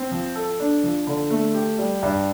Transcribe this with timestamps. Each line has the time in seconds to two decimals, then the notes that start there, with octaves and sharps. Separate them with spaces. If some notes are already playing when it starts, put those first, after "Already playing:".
Already playing: C4
0.11 F3
0.35 A4
0.60 D4
0.83 F3
1.07 D3
1.30 A3
1.54 G4
1.79 G3
2.03 G2